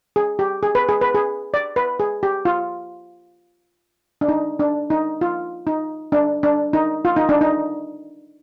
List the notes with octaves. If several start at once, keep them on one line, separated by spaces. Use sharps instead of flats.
G#4
G4
G#4
B4
G#4
B4
G#4
D5
B4
G#4
G4
F4
D4
D#4
D4
D#4
F4
D#4
D4
D4
D#4
F4
D#4
D4
D#4